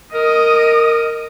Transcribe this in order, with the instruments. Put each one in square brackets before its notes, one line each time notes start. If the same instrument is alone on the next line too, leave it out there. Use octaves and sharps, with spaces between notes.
[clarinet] A#4 [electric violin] D#5 D#6